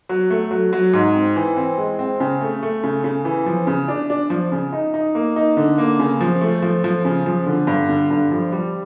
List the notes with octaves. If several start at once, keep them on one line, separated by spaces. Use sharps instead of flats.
F#3
A3
F#3
F#3
G#2
C4
E3
C4
G#3
C4
C#3
A3
A3
C#3
C#3
E3
F3
C#3
D4
D4
F3
C#3
D#4
D#4
A#3
D#4
D3
A#3
C#3
F3
A3
F3
F3
C#3
F3
D3
G2
D3
G2
F3
G3